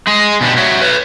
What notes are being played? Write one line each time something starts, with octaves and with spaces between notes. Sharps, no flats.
G#3 G#4
B2 D4 G4
F#4 C#5 E5
B4 C#5